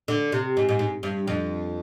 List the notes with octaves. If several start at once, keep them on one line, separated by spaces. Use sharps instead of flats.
D3
C3
G#2
G#2
G#2
G2
F2